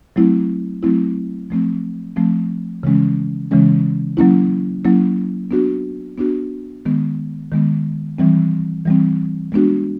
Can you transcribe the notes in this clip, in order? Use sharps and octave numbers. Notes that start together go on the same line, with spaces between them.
F#3 A3 C4 E4
F#3 A3 C4 E4
F3 A3 C4
F3 A3 C4
C#3 E3 G#3 C#4
C#3 E3 G#3 C#4
F#3 A#3 C#4 E4
F#3 A#3 C#4 E4
B3 D4 F#4
B3 D4 F#4
D#3 G#3 B3
D#3 G#3 B3
E3 G3 C4
E3 G3 C4
G#3 B3 D4 F#4